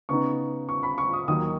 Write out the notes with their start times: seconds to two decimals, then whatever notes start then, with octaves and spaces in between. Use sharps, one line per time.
0.09 C#3 B3 D#4 C#6
0.69 C#6
0.83 B5
0.98 C#6
1.13 D#6
1.28 D#2 D#3 F#3 D#6